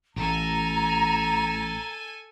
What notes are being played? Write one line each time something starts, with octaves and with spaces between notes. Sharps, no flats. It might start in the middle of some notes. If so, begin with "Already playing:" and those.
A1 A4 G#5 A#5